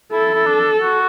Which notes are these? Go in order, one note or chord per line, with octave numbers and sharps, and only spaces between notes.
E4 A4
E4
D4
F#4